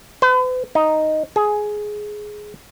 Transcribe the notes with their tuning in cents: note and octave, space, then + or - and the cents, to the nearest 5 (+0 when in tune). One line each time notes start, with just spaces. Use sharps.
B4 +45
D#4 +0
G#4 +10